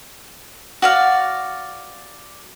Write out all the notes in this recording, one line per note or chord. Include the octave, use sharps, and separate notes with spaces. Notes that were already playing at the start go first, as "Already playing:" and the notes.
F#4 D5 F5